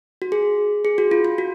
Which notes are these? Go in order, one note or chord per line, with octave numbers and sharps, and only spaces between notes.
F#4
G#4
G#4
F#4
F4
F4
F#4